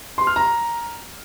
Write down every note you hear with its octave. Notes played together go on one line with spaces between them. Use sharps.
C6
F6
A#5